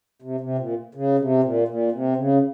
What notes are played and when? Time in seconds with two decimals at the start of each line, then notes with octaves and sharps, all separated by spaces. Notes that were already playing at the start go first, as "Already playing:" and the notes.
0.22 C3
0.40 C3
0.58 A#2
0.95 C#3
1.19 C3
1.44 A#2
1.68 A#2
1.92 C3
2.17 C#3